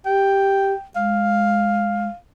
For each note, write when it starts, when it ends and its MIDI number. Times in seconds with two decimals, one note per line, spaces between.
0.05 0.74 67
0.05 0.85 79
0.96 2.08 56
0.96 2.15 77